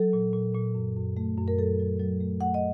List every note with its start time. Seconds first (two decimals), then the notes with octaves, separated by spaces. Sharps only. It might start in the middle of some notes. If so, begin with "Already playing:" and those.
Already playing: F#3 A4
0.13 A#2
0.33 A#2
0.54 A#2
0.75 F#2
0.96 F#2
1.17 A3
1.37 F#2
1.48 A#4
1.58 F#3 A4
1.79 F#3
2.00 F#3
2.21 A3
2.41 A3 F#5
2.54 D#5